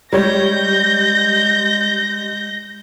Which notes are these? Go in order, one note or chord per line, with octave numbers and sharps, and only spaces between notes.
G3 G#3 C#5 G6 G#6 A#6